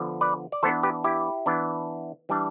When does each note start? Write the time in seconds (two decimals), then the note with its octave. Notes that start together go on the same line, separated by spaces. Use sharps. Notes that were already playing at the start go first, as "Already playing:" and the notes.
Already playing: D3 F3 B3
0.21 B4 D5
0.52 D5
0.63 E3 B3 D4 A4 C5
0.83 G4 B4
1.04 E4 G4
1.46 E3 B3 D4
2.29 E3 G3 D4